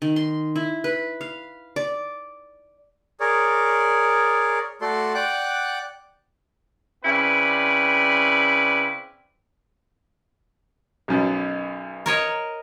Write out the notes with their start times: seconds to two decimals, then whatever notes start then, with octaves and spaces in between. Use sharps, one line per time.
0.02 D#3
0.16 C6
0.56 E4
0.84 B4
1.21 F5
1.76 D5
3.20 G#4 A#4 C#5 D5
4.81 A3 F#4 A4 D5 C6
5.14 D5 F#5 G5 D6 F#6
7.04 C#3 C4 E4 B4 D5
11.08 B1 F#2 B2
12.06 A#4 C#5 D#5